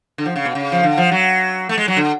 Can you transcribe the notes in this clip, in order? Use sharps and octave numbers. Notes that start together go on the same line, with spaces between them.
D3
F3
C#3
B2
C#3
F3
D3
F3
F#3
A3
G#3
F#3
D3